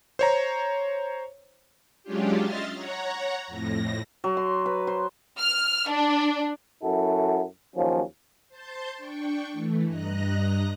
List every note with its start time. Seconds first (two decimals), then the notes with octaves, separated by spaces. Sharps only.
0.19 C5 C#5 A#5
2.03 F#3 G#3 C#4 D4 F4 G4
2.41 D#5 E5 C6 F6 A6
2.73 C#5 F#5 A#5
3.48 F2 A2 A#6
4.24 F#3
4.37 C6
4.66 B4
4.87 C5
5.39 F6
5.90 D4
6.83 F#2 E4 F#4 A4
7.74 D#2 F3 F#3 C#4
8.48 C5 A5 C6 G6 A6
8.97 D4 G5 C#6
9.52 E3 A3
9.86 G2 D#5 A#5 F#6 A#6